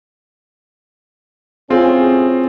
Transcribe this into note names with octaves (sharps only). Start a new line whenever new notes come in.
A2 C4 C#4 F4 G#4